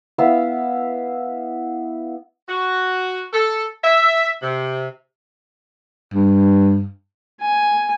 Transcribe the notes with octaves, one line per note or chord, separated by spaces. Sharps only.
B3 E4 E5 F5
F#4
A4
E5
C3
G2
G#5